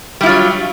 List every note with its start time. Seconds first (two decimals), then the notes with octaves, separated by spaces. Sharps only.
0.21 G3
0.23 E4
0.26 F4
0.29 F#3